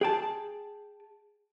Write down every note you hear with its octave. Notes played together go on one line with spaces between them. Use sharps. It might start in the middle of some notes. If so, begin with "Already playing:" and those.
G#4 G5 A5